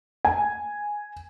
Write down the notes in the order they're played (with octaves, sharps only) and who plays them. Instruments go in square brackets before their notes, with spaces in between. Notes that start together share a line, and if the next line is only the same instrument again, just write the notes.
[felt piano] G#5